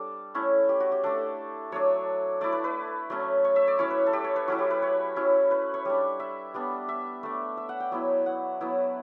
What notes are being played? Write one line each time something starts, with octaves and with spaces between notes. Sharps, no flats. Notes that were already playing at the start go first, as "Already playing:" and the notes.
Already playing: G3 D4 A4
A3 C#4 E4
G4
F#4
G4
A3 D4 A4
F#3 A3 D4 C#5
A3 E4 D5
B4
B4
F#3 A3 C#4
C#5
E5
D5
F#3 C#4 E4 C#5
B4
A4
G4
C#5
B4
F#3 C#4 E4 F#4
G4
B4
C#5
F#3 C#4 E4
B4
C#5
G3 D4
E5
G3 B3 D4
E5
A3 D4
E5
F#5
G5
F#3 B3 E4
F#5
F#3 B3 E4